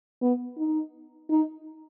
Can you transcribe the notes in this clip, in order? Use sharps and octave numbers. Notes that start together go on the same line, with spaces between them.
B3
D#4
D#4